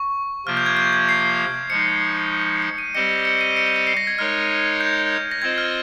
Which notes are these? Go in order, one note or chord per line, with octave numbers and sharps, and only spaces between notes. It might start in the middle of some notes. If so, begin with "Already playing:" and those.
Already playing: C#6
C3 F3 A#3 F4 F6
G6
G#6
G6
G#6
C7
F3 G#3 D#4 C#7
C#7
D#7
G3 C4 G4 C5 D#5 C#7
C#7
D#7
C#7
D#7
C#7
C7
A#6
G#6
G#3 D#4 A#4 C#5 F6
G6
A#6
C4 F4 C5 D#5 G#6
F6